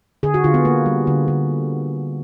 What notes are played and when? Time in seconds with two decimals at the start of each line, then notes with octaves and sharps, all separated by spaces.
0.23 D3 G#4
0.34 F#4
0.44 D3 F4
0.54 B3
0.65 A#3
0.86 G3
1.07 D3
1.28 D3